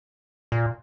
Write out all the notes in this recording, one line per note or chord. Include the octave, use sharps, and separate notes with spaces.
A#2